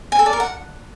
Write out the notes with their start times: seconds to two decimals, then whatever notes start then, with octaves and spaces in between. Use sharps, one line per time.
0.12 G#5
0.19 A4
0.26 D5
0.33 A#4
0.40 F#5